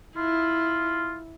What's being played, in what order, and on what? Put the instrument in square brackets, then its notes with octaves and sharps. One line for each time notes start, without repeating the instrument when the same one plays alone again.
[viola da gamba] E4 [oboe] F4